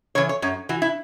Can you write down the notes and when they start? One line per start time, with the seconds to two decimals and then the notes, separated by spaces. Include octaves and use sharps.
0.15 C#3 E3 C#5
0.29 C#5
0.42 F#2 C#5
0.69 E3 F#4
0.82 E4